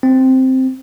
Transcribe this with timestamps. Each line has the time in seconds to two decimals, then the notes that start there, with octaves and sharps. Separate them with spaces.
0.03 C4